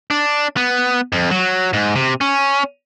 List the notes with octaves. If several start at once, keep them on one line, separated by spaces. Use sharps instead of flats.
D4
B3
F2
F#3
G#2
C3
C#4